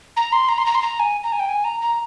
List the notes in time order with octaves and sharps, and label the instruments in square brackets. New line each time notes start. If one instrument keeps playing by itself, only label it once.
[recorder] A#5
C6
A#5
C6
A#5
C6
A#5
G#5
A#5
G#5
G5
G#5
A#5
A#5